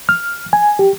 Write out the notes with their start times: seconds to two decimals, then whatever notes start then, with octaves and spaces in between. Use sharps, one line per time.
0.09 F6
0.53 G#5
0.79 G4